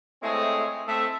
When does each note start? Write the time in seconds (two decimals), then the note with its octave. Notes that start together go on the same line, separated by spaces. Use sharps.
0.23 G#3 A3 C4 E4 G#4 C#5
0.88 A3 C4 A4 E5